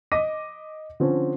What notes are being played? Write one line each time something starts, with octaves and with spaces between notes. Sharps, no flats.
D#5 D6 A#6 B6 D#7
D3 F3 C4 C#4